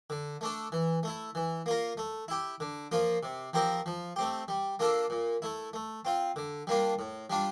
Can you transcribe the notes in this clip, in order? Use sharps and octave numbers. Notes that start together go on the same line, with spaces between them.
D3
A3 D4 A4
E3
A3 E4
E3
A#3 F4 A#4
A3
E4 G4
D3
F3 A#3 F4
C3
F3 C4 G4 A#4
F3
A3 C4 G4
G3
A#3 D4 F4 A4
A#2
A3 E4
A3
C4 F4
D3
G3 A#3 D4 F4
A2
G3 D4 F4